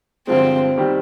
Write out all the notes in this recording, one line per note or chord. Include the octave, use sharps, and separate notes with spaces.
G2 D3 F3 G#3 C4
D#3 G3 C4 G4